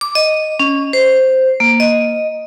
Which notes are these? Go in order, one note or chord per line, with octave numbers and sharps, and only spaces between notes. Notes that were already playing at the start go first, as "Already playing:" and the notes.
D6
D#5
C#4
C5
A#3
D#5